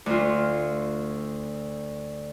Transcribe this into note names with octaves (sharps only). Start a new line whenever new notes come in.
D2 F4